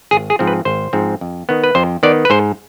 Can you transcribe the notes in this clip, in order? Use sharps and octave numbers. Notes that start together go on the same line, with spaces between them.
G#1 G#4
G#4
G#2 F3 C4
B4
G#1 C5
G#2 F3 C4
F2
D#3 B3
B4
F2 C5
D#3 B3 D5
B4
G#2 C5